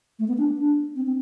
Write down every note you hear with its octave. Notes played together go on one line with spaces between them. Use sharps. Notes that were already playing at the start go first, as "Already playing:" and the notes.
A3
B3
D4
D4
C4
C4